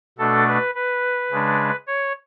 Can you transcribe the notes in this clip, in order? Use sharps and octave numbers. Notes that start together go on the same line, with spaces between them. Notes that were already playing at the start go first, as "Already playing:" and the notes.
B2 A3 D4 A4
B4
B4
C#3 G#3 D4
C#5